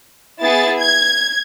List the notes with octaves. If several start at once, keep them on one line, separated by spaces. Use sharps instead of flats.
B3 E4 G#4 A6
G#6